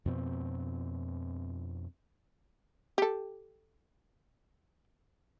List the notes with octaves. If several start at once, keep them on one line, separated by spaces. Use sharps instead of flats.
F2 B2 C4
G4 A4